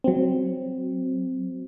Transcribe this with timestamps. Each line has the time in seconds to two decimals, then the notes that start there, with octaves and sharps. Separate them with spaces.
0.04 F#3 C4